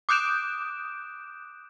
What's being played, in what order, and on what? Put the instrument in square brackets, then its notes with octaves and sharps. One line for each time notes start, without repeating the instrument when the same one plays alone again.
[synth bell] D6 D#6 F#6 G6 D7 E7